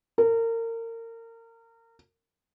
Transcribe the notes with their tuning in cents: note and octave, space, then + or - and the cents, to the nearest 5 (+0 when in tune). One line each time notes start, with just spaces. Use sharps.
A#4 -30